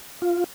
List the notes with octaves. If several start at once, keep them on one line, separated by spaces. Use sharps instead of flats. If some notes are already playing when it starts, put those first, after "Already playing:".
F4